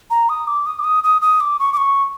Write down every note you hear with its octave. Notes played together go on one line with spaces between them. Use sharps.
A#5
D#6
D6
D#6
D6
D#6
D#6
D#6
D6
C#6
D6
C#6